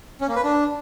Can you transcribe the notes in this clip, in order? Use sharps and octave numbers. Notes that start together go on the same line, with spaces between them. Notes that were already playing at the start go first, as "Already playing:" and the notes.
C#4
A#3
B4
D4